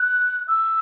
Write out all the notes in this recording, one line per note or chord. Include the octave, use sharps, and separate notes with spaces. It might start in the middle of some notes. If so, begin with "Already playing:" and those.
Already playing: F#6
E6